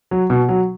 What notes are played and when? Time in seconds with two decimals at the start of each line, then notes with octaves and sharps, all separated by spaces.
0.11 F#3
0.30 B2
0.49 F#3